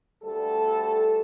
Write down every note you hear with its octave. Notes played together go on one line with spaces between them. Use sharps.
D2 G3 A4